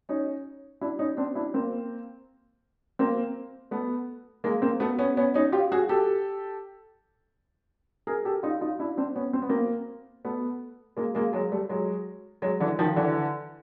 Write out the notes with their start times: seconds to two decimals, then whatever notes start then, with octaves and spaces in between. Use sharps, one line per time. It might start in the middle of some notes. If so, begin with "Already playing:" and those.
0.09 C#4 D#4
0.81 D4 E4
0.99 C#4 D#4
1.17 C4 D4
1.35 D4 E4
1.54 A#3 C4
2.99 A#3 C4
3.71 A3 B3
4.44 G#3 A#3
4.62 A#3 C4
4.80 A3 B3
4.99 B3 C#4
5.17 B3 C#4
5.34 C#4 D#4
5.52 F4 G4
5.72 F#4 G#4
5.89 G4 A4
8.07 G#4 A#4
8.25 G4 A4
8.43 D#4 F4
8.61 D#4 F4
8.79 D4 E4
8.97 C4 D4
9.16 B3 C#4
9.33 C4
9.42 B3
9.49 A#3 C4
10.25 A3 B3
10.97 G#3 A#3
11.15 G#3 A#3
11.33 F#3 G#3
11.52 G3 A3
11.69 F#3 G#3
12.42 F#3 G#3
12.60 D3 E3
12.79 D#3 F3
12.96 D3 E3